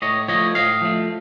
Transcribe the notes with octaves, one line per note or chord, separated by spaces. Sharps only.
A2 C#5 D#5
F3 A3 C#5 D#5
A2 D#5 F5
F3 A3